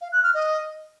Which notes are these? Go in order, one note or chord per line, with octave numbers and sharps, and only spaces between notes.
F5
F#6
F6
D#5